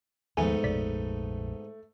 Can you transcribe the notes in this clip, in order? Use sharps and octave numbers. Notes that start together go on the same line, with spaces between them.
D#2 G#2 F3 A3 B3 D#4 G#5
A#1 F2 B2 D5 B6